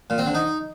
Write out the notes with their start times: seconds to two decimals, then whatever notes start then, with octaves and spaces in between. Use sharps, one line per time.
0.10 A#2
0.18 C4
0.26 D3
0.34 D#4